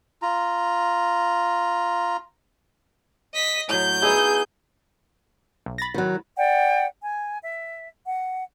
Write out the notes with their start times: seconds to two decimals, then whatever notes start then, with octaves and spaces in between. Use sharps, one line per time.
0.22 F4 A#5
3.34 D#5 B6
3.69 A2 F#3 G6
4.02 B3 D#4 E4 G#4
5.66 B1
5.78 B5 A6 A#6
5.94 D#3 F#3
6.37 D5 F#5 G5
7.03 G#5
7.42 E5
8.06 F#5